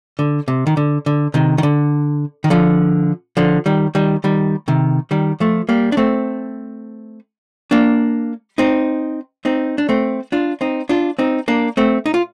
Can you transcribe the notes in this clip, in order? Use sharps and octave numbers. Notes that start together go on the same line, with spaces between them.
D3
C3
D#3
D3
D3
C3 D#3
D#3
D3
D#3
D3 F3
D3 F3
D#3 G3
D#3 G3
D#3 G3
C3 D#3
D#3 G3
F3 A3
G3 A#3
D4
A3 C4
A#3 D4
C4 D#4
C4 D#4
D4
A3 C4
D4 F4
C4 D#4
D4 F4
C4 D#4
A#3 D4
A3 C4
D#4
F4